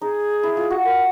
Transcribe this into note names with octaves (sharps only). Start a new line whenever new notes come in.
D#4 G#4
E4
F4
F#4
A#4